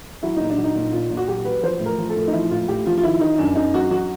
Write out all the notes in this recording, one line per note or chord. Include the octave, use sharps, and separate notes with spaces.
F#3 E4
A#2 D#4
D4
F#3
D#4
A#2
A#2 F4
A#2
F#4
F#3 G4
F#3 B4
F3 C5
A2
A#4
F3
A4
A2
D#4
F3 E4
A2 F4
A2 G4
F3 F4
F4
D#3 E4
D#3 D#4
F#2 D4
F#2 D#4
F#3 F#4
F#3 F#4